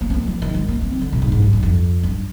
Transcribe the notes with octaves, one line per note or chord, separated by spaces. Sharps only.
A#3
C4
A#3
G3
F3
D#3
G#3
A#3
C4
D#3
D3
A#2
G#2
G#2
G2
G2
F2
G2